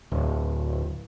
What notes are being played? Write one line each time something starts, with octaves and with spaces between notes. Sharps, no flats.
D1